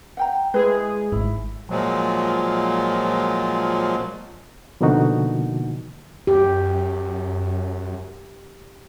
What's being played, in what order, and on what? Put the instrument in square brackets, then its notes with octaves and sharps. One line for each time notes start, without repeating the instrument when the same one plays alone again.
[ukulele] F#5 G5 A#5
[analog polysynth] G#3 G#4 [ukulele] E4 B4
[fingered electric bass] G#1 G#2 [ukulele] E4
[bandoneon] A#2 F3 F#3 G#3
[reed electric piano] B2 D3 F3 A#3 D#4 F#4
[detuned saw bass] F#2 [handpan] G4